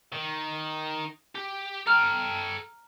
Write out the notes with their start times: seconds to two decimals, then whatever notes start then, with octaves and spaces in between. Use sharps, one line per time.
0.13 D#3
1.36 G4
1.87 A4 G5 A#5 F6